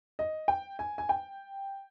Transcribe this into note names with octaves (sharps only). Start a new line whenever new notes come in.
D#5
G5
G#5
G#5
G5